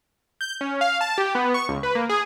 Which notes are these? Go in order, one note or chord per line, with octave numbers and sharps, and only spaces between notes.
G6
C#4
F5
A5
G4
B3
C#6
C#2
B4
A#3
G#4